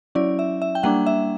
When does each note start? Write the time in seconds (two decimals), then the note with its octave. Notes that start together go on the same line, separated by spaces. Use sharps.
0.15 F#3 C#4 E4 D5
0.39 E5
0.62 E5
0.75 G5
0.83 G3 A#3 D4 F#5
1.06 E5